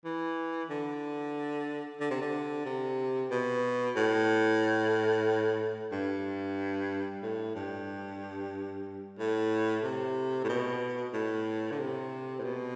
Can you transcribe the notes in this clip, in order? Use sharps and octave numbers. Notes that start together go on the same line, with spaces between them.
E3
D3
D3
C3
D3
C3
B2
A2
G2
A2
G2
A2
C3
A2
B2
A2
D3
C3
A2
B2